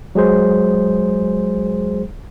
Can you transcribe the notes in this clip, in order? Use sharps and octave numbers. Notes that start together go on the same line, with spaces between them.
F#3 G#3 G#4 C5